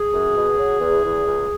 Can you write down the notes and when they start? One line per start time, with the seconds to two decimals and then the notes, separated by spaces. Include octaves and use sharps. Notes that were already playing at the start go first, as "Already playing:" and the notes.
Already playing: G#4
0.14 F#2
0.36 B2
0.58 F#3
0.80 E2
1.03 E2
1.26 C#2